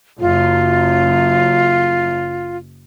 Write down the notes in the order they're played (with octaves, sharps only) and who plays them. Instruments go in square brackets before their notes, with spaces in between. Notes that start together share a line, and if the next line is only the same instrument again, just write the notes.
[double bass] F#1 F#2 [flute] F4